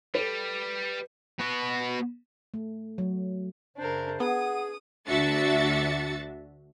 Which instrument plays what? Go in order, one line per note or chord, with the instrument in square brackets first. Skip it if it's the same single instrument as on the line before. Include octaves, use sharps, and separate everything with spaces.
[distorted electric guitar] G3 [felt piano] A4 B4
[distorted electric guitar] B3 F#4
[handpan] A3
F#3
[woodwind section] F#2 C#3 C5 [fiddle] D4 A#4
[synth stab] B3 [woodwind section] G#4 [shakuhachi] F#5 [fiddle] D#6
[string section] D2 D4 F#4 E5 A6 C#7